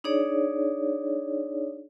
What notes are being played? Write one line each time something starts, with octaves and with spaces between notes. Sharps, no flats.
D4 D#4 G#4 C#5 D5